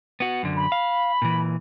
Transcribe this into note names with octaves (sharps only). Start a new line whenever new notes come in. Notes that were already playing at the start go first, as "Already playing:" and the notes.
B3 F#4
F#2 D3
B5
F5
A#2 E3